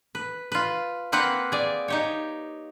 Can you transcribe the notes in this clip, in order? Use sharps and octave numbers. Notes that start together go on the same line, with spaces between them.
B4
F4 B4
A#3 C4 B4 F5 F#5
G#4 D5
D#4 G4 C#5